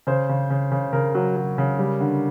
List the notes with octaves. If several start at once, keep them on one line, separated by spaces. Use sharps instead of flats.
C#3 C5
C#3
C#3
C#3
C#3 A#4
F#3
F#3
C#3
G3
D3